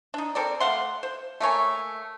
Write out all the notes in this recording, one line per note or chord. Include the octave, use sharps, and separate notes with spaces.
D4 D#4
C4 A4 A#4 D5
A3 F5 F#5 C6
C5
A3 A#3 C#5 G#5